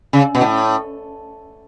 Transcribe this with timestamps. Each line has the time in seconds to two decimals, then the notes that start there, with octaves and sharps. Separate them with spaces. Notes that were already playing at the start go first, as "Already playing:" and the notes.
0.13 C#3
0.35 B2
0.41 A2